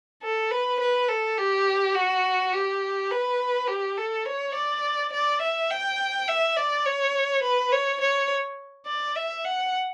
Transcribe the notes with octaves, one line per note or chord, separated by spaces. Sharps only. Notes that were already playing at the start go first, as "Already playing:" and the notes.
A4
B4
B4
A4
G4
F#4
G4
B4
G4
A4
C#5
D5
D5
E5
G5
E5
D5
C#5
B4
C#5
C#5
D5
E5
F#5